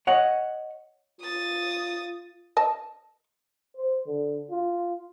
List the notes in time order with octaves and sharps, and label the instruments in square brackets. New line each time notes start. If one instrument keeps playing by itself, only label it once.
[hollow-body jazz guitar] C#5 D#5 F#5
[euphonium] F4 [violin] D#6 A6
[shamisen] D#5 A5
[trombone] C5
D3
F4